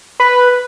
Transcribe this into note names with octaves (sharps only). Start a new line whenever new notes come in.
B4